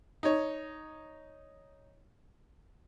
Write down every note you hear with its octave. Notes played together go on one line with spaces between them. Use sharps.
D#4 C#5